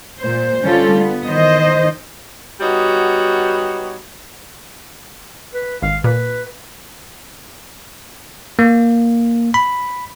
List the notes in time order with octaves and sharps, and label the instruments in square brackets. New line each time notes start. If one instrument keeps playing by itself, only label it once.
[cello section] A#2 C5
D3 G3 C#4 F4 A4
B3
D#3 E3 C5 D#5
[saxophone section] G3 B3 D#4 F#4 C#5
[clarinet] B4
[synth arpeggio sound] G#1 [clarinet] F5
[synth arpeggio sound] A#2 [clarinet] B4
[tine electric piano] A#3
B5